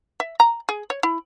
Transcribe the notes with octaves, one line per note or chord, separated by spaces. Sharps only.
E5
A#5
G#4
C#5
E4